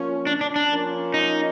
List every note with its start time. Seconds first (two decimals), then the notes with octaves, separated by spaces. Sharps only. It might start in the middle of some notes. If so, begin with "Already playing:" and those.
Already playing: F3 A#3 C#4
0.27 D4
0.41 D4
0.56 D4
0.70 F3 A#3 C#4
1.14 D#4